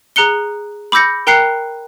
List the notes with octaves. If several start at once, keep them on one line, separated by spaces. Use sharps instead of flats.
G#4 A#5 F#6 C#7 G7
B5 D6 E6 G6 A#6 C#7
A#4 G5 A#5 F#6 C7 C#7